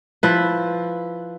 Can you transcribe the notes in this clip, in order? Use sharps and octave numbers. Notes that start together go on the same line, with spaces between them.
F3 E4 B4